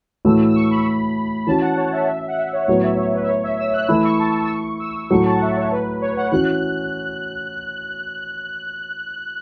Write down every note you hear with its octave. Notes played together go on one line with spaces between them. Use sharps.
A2 E3 A3 F#4 E6
E6
C#6
B5
E3 C#4 F#4 A5
F#5
C#5
E5
E5
F#5
E5
C#5
A2 F#3 B3 C#5
E5
C#5
B4
E5
C#5
E5
E6
F#6
E3 A3 E4 E6
C#6
A5
E6
C#6
E6
E6
A2 F#3 A3 F#4 C#6
A5
F#5
E5
C#5
B4
C#5
F#5
E3 C#4 F#4 F#6